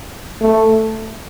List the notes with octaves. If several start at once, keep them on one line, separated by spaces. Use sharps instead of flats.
A3